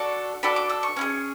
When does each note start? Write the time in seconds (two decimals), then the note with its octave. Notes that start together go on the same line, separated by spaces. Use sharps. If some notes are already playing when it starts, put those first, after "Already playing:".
Already playing: D4 F#4 A4 C#6
0.43 D4 F#4 A4 B5
0.56 D6
0.70 E6
0.83 C#6
0.97 C#4 E4 G#4